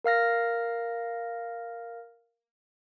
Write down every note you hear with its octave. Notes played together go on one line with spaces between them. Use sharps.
A#4 F5 F6 A#6